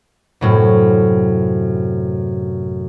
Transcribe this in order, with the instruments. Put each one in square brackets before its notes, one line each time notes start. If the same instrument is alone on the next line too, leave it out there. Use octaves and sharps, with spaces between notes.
[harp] F#2 A2 C3